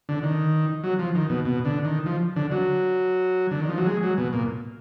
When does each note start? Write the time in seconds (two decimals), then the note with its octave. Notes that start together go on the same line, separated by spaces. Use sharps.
0.09 D3
0.23 D#3
0.84 F#3
0.99 F3
1.15 D#3
1.30 B2
1.45 B2
1.65 D3
1.85 D#3
2.06 F3
2.36 D3
2.51 F#3
3.51 D3
3.60 D#3
3.69 F3
3.78 F#3
3.87 G#3
4.03 F#3
4.18 B2
4.33 A#2